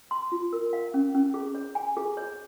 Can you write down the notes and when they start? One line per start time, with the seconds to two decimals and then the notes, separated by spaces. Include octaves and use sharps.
0.11 C6
0.32 F4
0.53 A#4
0.73 F5
0.94 C#4
1.14 C#4
1.34 G#4
1.55 C#5
1.75 G#5
1.97 G#4
2.17 C#5